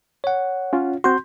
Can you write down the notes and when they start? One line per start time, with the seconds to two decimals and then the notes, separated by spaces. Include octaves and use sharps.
0.24 C#5 F#5
0.73 C#4 F4
1.04 C4 F#4 C6 G6